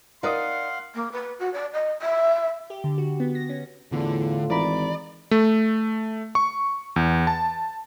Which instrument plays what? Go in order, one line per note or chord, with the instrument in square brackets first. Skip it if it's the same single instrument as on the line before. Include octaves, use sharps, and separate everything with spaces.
[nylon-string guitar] D#4 D5 [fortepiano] A#4 D#5 D#6 [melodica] F5 F#5 [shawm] C6
[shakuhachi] A#3
B4
F#4
D5
D#5
E5
[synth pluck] G4
D3
F#4
B3
A#6
C#4
[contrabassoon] E2 [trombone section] A2 F4 [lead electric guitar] D3
[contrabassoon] G#1 [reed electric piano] E3 A#5 B5 [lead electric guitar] D5
[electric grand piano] A3
C#6
E2
A5